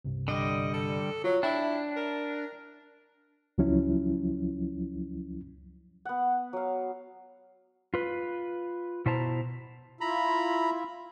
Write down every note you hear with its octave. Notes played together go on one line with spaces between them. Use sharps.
C2 G2 C3
D3 G3 D#5
A4
F#3 F4 C#5
D4 E4 G5
A#4
C#2 F3 F#3 C#4 E4
B3 F#5
F#3 F5
F4 B4
B2 E4 C5 A5 A#5
E4 F4 E5 A#5 B5